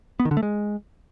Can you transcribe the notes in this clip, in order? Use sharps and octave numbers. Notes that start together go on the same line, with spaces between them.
B3
D#3
D3
A3
G#3